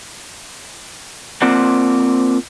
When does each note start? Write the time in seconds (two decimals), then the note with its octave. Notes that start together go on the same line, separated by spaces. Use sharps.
1.42 A#3 C4 F4 C5 D5 F#5